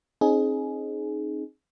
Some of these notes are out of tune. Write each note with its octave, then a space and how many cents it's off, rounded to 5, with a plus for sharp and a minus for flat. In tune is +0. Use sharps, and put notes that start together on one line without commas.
C4 +40 D#4 -10 G#4 +15